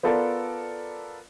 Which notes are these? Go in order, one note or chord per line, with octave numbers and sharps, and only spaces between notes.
B3 F4 A4 A#4 D5